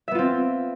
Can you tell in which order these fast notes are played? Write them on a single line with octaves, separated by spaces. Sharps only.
E5 B3 F4 C4